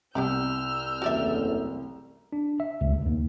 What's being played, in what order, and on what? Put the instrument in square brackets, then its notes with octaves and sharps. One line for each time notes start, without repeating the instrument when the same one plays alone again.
[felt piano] C2 [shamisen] B3 G4 B5 [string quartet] E6 F6 G6
[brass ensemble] F#1 E2 A3 [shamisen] F#4 D5 E5
[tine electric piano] D4
E5
C#2
D2
D#2